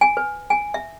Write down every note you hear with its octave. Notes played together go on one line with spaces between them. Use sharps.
G#5
B4
G#5
E5